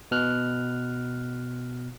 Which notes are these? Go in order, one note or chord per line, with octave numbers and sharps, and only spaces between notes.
B2 F6 F#6